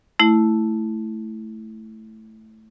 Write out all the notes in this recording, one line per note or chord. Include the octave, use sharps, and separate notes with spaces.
A3 E4